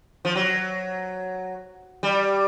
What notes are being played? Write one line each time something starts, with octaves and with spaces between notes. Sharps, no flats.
F3
F#3
G3